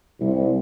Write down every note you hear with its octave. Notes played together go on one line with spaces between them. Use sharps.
C2